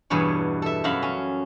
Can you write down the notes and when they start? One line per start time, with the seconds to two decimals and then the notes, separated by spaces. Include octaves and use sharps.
0.10 E2 G2 B2 C#5
0.62 A4 E5
0.84 F#2 F#3 E5 F5 B5
1.03 C#4